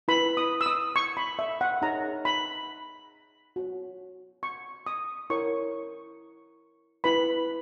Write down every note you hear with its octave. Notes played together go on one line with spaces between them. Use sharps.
E4 B4 B5
D#6
E6
D#6
C#6
B5
E5
F#5
D#4 G#4 C#5 A#5
B5
F#4 C#5
C#6
D#6
E4 A#4 C#5 C#6
E4 B4 B5